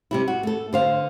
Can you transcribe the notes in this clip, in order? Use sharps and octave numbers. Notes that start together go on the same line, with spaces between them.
C3 G3 E4
F#4
A3 A4
D3 C5 F5